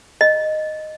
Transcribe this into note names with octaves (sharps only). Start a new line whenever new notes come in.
D#5